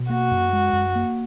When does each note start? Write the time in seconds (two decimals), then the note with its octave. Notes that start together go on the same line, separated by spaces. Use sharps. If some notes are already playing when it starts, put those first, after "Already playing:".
Already playing: B2
0.10 A#3 F#4
0.31 F#2
0.53 G#3
0.73 F#2
0.95 A#3